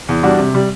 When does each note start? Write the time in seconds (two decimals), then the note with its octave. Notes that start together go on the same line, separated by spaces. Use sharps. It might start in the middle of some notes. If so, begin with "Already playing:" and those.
0.09 E2
0.23 G3 D4 F#4
0.38 C3
0.55 G3